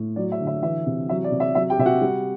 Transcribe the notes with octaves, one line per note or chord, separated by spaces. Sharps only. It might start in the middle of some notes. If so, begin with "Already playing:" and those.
Already playing: A2
F#3 D5
E5
D3
E5
E3 E5
C3
F#3 E5
D5
C3
E5
F#3 E5
G4 G5
C3 E5
F#4 F#5
G3